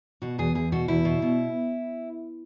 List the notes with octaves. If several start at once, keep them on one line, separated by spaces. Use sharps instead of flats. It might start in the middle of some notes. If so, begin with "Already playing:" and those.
B2 F#4
E2 G#4
E2 G#4
B2 F#4
E2 E4
B2
B2